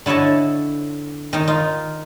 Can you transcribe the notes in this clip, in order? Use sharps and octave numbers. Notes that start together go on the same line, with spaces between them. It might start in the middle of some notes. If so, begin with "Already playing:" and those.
D3 E4 C#5 D#5 A5
D#3 D#4
D#4 F4